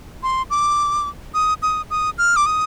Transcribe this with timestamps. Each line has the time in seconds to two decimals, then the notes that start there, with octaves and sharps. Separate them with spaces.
0.23 C6
0.50 D6
1.34 D#6
1.62 D#6
1.91 D#6
2.18 F6
2.36 D6
2.46 D#6